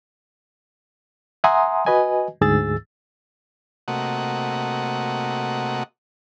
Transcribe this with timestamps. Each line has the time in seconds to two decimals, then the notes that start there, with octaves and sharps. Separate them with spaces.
1.44 E5 F#5 G#5 A#5 C6 D#6
1.86 F#4 B4 D#5 G#5
2.41 D2 G#2 G#4 E6 A6
3.88 C3 A3 A#3 F#4 D#5 F#5